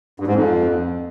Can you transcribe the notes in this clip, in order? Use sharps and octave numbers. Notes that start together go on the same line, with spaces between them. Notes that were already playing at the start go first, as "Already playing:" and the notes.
G2
G#2
F2